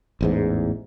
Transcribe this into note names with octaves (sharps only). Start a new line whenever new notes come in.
A1 E2 G#2